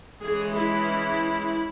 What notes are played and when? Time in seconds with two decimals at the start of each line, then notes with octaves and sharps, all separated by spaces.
0.21 E3 G#3 C#4 G#4
0.53 E4